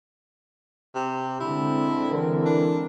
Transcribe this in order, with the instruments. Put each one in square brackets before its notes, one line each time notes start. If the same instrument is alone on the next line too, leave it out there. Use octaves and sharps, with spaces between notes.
[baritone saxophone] C3
[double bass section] D3 G#3 C4 [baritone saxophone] E4
[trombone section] E3 A4 A#4
[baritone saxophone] D4